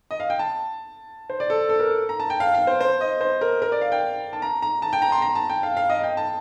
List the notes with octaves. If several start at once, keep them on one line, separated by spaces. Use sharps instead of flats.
D#5
F5
G5
A5
C5
D5
A4
A4
A#4
A#5
A5
G5
F5
F5
C5
C5
D#5
C5
A#4
A#4
D5
F5
G5
A5
A#5
A#5
A5
G5
A#5
C6
A#5
A5
G5
F5
F5
D#5
G5
A5